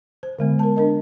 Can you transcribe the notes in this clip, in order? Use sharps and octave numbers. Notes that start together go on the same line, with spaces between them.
C5
D3 G#3 B3 F#5
A#4 A5
D4 A#4 D#5